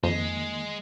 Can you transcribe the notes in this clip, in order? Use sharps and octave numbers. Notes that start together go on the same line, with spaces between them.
F2 D#3 G#3 A#3